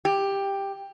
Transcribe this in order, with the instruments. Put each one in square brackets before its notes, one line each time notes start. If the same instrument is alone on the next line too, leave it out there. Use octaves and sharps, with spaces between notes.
[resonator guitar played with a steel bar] G4